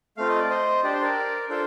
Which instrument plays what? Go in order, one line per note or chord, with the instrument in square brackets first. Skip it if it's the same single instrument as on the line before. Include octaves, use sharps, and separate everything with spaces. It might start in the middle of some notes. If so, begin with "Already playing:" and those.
[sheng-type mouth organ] A3 C4 F4 F5
D#5
D5
C5 D#5
D4 G4 D5
C5
A#4 D5
D4 F4 A4 C5